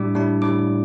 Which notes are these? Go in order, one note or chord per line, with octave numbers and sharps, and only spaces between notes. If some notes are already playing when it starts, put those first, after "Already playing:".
Already playing: A2 G3 D4 D6
A2 G3 D4
A2 G3 D4 D6